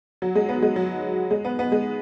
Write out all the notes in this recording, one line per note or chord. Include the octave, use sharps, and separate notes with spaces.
F#3
G#3
B3
G#3
F#3
G#3
B3
B3
G#3